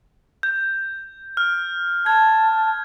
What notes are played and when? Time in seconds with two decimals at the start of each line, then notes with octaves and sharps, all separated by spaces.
0.43 G6
1.37 F6
2.06 A5 G#6